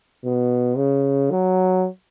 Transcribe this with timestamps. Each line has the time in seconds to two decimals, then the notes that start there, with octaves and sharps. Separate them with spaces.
0.25 B2
0.77 C#3
1.31 F#3